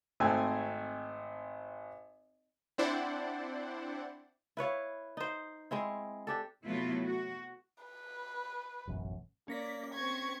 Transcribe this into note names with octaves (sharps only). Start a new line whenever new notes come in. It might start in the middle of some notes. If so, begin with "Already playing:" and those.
G#1 A3 C4 G#5
C4 D4 E4 C5 D5 F#5
E4 B4 C#5 F5
D#4 C5
G#3 C4 E4
D4 G4 A4
C3 F#3 A3 B3 E4 F4
F#4
B4
E1 A1 F#2
A#3 C#4 D5 A#6 B6
C4 C#6 G#6